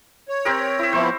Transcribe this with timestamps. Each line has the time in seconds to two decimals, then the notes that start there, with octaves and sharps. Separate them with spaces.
0.29 C#5
0.45 C4 G4 A#4
0.79 E4 E5
0.93 F3 B3 E4 C5 C#5